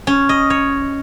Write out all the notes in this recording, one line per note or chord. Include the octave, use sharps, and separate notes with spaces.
C#4
D#5
C#5